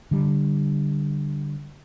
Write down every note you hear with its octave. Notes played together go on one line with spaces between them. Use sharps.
D3 G3